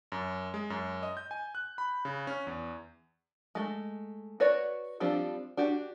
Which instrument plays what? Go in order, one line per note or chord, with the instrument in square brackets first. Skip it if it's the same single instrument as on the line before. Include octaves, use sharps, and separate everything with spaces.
[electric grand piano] F#2
G#3
F#2
D#5
G6
G#5
F#6
B5
C#3
C#4
E2
[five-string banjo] G#3 A3
F#4 B4 C#5 D5
F3 G3 C4 D4
D4 F#4 G4